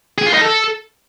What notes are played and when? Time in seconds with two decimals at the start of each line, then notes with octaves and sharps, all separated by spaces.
0.18 G#4
0.26 F4
0.34 D#4
0.41 A4